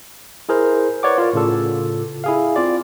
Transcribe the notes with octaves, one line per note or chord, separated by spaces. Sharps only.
E4 G#4 A#4 C5
B4 C#5 D5 F#5 D6
F4 A#4 D5
A2 C#3 F4 A4
E4 G#4 F5
C4 F4 D5